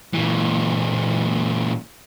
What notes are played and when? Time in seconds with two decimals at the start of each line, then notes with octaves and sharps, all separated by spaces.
0.13 A#2 E3